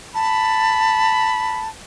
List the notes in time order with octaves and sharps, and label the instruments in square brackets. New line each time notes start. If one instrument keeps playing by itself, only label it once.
[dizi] A5 [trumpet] B5